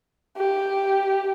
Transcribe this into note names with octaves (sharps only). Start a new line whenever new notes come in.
G4